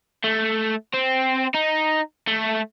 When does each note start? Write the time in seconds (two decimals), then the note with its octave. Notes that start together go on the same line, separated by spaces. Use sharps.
0.24 A3
0.94 C4
1.54 D#4
2.27 A3